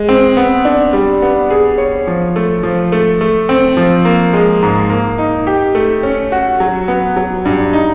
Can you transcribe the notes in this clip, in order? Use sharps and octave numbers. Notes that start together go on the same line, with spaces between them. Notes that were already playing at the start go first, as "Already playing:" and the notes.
Already playing: G#3
C4
B3
D4
G3
B3
G#4
C#5
F3
A3
F3
A3
A3
C4
F3
A#3
G#3
G#2
A#3
D#4
G4
A3
C#4
F#4
F#3
B3
F#3
G2
D#4